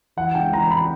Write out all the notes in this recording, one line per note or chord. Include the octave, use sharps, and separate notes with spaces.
E3 F#5
C#2 G5
E3 A#5
A#5
E3 B5